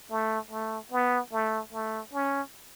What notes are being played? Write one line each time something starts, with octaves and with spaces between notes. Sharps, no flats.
A3
A3
B3
A3
A3
C#4